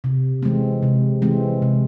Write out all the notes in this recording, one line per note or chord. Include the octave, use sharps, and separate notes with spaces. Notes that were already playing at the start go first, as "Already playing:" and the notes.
C3
E3 G#3 C4
C3
E3 G#3 C4
C3